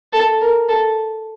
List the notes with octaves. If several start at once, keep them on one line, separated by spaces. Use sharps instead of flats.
A4
A#4
A4